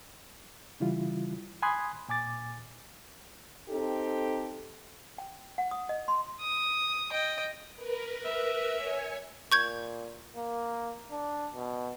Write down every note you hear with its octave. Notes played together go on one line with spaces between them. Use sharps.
C#3 E3 G3 E4 F4
G#5 B5 C6 D#6 F#6 G#6
A#2 G#5 D6 A6
C4 D#4 G4 A4
G5
F#5
D#6
D#5
C6
D#6
D#5 G5
A#4 B4
E5
C#5 G#5
A#2 C#6 G6 G#6
A#3
D4
B2